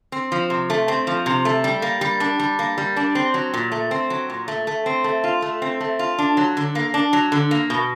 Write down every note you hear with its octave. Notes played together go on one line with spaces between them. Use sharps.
C4
F3
C3
A3
C4
F3
C3
A3
G3
A#3
G3
D4
G3
A#3
G3
D4
C4
F#3
A#2
A3
C4
F#3
A#2
A3
A3
C4
A3
F4
A3
C4
A3
F4
D4
F#3
D3
A#3
D4
F#3
D3
A#3
B2